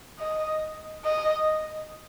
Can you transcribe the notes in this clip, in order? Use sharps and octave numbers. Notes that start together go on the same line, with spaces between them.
D#5
D#5